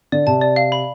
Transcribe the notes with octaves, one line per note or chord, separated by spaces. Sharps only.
D3 D5
C3 A5
D5
F5
B5